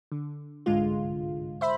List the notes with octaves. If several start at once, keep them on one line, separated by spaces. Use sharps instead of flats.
D3
G1 C2 G#2 D3 G#3 F4
C5 E5 B5